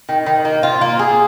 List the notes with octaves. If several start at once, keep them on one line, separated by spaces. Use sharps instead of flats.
D#3
D#3
A#3
F4
A#3
G#4